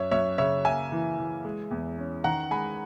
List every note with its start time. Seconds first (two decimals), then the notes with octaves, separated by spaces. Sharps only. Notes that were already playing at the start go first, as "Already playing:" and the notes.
Already playing: F#2 C#5 E5
0.11 F#2 C#5 E5
0.38 C#3 C#5 E5
0.65 A#3 E5 G#5
0.92 E3
1.18 E3
1.45 G#3
1.71 E2
1.98 C#4
2.24 D#3 F#5 A#5
2.51 G#3 G#5 B5